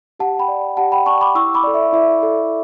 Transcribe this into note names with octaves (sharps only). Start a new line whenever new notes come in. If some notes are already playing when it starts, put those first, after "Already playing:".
G4 F#5 A5
G5 B5
D5
G4 F#5 A5
G5 B5
D5 A5 C#6
B5 D6
E4 C#6 E6
B5 D6
A4 D5
E5
E4 E5
A4 D5